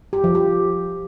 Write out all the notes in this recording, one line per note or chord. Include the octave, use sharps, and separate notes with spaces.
G4
F3
G4